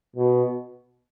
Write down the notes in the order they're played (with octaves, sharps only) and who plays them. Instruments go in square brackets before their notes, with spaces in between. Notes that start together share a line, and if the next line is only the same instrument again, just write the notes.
[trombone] B2